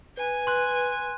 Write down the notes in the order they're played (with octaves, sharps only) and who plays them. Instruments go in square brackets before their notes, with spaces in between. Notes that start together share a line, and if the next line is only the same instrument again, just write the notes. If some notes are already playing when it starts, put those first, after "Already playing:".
[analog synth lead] B4 [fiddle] G#5
[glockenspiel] C6 F#6